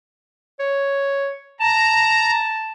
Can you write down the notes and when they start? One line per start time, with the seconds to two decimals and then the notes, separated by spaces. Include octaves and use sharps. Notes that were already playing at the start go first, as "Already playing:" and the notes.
0.59 C#5
1.61 A5 A#5